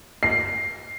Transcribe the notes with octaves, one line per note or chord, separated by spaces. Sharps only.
C7